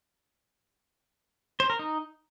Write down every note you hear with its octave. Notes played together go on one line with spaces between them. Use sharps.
C5
A#4
D#4